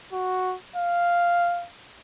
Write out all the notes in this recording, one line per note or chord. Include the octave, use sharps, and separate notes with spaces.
F#4
F5